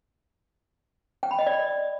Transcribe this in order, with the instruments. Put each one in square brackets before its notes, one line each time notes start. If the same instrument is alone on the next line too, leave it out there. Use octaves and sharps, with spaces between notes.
[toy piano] G5
B5
D#5
D5